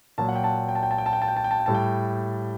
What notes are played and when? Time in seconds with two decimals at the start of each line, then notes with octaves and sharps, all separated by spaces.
0.18 A#2 F#3 A5
0.28 F#5
0.35 G5
0.44 A5
0.69 G5
0.75 A5
0.83 G5
0.91 A5
0.98 G5
1.06 A5
1.13 G5
1.22 A5
1.28 G5
1.36 A5
1.44 G5
1.51 A5
1.59 G5
1.66 A2 G3 A5
1.75 G5